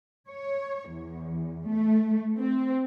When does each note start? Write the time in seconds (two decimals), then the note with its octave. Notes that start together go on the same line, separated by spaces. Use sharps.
0.29 C#5
0.90 E2
1.69 A3
2.38 C4